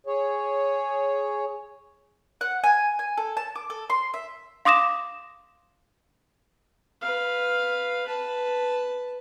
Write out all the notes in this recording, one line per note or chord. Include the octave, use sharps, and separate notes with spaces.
G#4 C#5
F#5
G#5
G#5
A4
A5
D6
A4
C6
E5
F5 C6 D6 D#6 A#6 E7
B4 F5
B4 A5